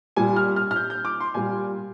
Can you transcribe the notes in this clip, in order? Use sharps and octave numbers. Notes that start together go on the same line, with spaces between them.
A#2 G3 G#5
F6
F6
F6
G6
G6
D6
C6
A#2 G3 G#5